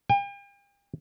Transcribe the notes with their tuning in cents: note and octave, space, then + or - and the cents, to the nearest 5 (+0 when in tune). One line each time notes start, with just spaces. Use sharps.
G5 +45